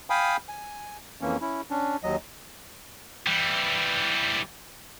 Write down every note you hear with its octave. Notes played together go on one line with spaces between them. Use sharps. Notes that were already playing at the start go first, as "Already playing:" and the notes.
F5 G5 G#5 B5 D#6
G#5
F2 E3 A#3 C#4
C#4 E4
C#4 D4
D#2 F#3 D#5
E3 G3